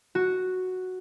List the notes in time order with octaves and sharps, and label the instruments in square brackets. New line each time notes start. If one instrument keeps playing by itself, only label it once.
[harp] F#4